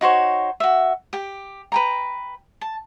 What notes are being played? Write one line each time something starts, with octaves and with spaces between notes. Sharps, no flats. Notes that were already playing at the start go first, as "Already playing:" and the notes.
D#4 F#4 C5 C#5
F#4 E5
G4 G5
B4 G5 A#5
A5